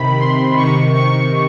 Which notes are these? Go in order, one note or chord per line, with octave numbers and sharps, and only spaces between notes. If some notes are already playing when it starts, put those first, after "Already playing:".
Already playing: C3 D#3 B5
C6
C3 D#3 C#6
C#6